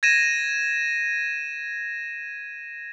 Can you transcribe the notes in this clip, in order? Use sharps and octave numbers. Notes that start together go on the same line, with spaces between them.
G#6 A#6 D#7 E7